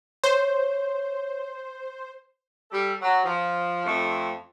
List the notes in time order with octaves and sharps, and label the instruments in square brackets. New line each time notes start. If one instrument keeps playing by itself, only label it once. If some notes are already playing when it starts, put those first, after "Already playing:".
[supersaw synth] C5 [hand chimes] C#5
[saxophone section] G3 A4
F#3
F3
F2 A3